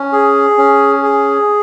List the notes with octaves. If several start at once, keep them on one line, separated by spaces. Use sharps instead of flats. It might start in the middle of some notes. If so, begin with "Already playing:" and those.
Already playing: C#4
G#4
C#4
G#4